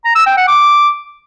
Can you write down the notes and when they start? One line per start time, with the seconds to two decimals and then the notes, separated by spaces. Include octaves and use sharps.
0.05 A#5
0.16 E6
0.26 G5
0.37 F#5
0.48 D6